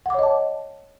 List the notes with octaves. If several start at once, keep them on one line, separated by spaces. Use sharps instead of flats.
C#5 D#5 F#5 A5 D6